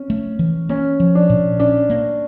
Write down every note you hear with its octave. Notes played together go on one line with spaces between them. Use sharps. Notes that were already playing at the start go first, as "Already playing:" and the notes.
Already playing: C4 C#4
A3
E3
A#3 C#4
F3
D4
A#2
C#4 D4
A#3